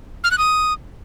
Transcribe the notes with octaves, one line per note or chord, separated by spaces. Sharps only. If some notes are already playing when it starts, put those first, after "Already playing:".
F6
F#6
D#6